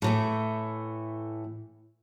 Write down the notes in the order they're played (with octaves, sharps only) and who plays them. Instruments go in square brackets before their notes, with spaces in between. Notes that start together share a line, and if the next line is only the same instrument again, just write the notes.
[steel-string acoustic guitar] A2 E3 A3